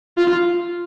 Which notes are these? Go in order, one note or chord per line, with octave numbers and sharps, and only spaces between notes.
F4